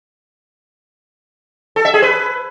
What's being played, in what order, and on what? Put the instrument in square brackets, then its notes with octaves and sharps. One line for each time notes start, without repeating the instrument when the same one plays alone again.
[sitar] A4
E5
G#4
B4